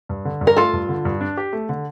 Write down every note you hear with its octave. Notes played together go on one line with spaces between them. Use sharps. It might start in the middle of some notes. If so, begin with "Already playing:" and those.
G2
D3
G2
A#4
A3 F4 A4
G2
D3
G2
D4
G4
A3
D3